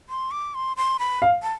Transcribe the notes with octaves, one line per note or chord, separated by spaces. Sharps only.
C6
D6
C6
C6
B5
F5
A5